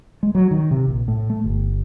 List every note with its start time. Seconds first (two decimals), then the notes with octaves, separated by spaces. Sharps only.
0.23 G#3
0.35 F#3
0.51 D#3
0.71 C3
0.88 A#1
1.08 A2
1.30 A3
1.44 G1